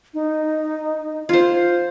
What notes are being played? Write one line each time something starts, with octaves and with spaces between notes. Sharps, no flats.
D#4
F4 C5